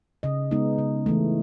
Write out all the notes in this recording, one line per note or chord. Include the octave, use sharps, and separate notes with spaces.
C#3 D#5
G#3 B3 D#4
C#3
E3 A3